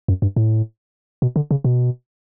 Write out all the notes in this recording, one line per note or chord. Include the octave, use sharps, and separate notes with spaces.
F#2
G2
A2
B2
D3
C#3
B2